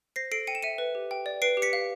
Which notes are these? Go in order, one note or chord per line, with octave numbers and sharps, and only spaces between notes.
C5 A#6 C7
A4 C7 D7
G5 C#7 D#7
E7
E5 C#7 D#7
B4
G4
G5
D5
B4 C7 D7
G4
B6 C#7
F5